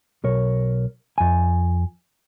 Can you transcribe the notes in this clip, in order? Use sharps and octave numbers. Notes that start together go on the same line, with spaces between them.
B1 A#4 C#5
F2 G#5